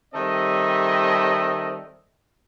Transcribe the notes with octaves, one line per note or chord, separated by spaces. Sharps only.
D#3 G3 C4 A4 D#5 E5